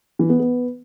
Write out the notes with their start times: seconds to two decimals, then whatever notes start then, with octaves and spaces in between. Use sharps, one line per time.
0.19 E3
0.29 B3
0.40 B3